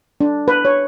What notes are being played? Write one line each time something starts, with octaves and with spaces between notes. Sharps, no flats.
D4
B4
C#5